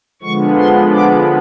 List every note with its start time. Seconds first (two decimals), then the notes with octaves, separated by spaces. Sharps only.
0.22 D3 F3 G#3 B3 C#6
0.57 C6
0.93 D6